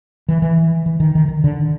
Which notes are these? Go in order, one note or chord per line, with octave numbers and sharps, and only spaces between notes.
E3
E3
E3
D#3
D#3
D#3
D3